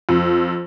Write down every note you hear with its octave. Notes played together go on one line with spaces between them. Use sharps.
F2